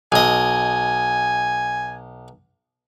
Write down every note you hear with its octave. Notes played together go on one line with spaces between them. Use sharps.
B1 D#5 G#5